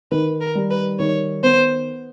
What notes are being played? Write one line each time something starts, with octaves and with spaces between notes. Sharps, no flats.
D#3 B4
A#4
G3
B4
D#3 C#5
B3 C5